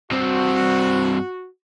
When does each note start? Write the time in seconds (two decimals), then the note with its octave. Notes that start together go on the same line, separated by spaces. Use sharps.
0.11 G2 C4 F#4